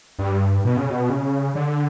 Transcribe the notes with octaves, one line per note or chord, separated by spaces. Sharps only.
G2
B2
C#3
B2
C#3
D3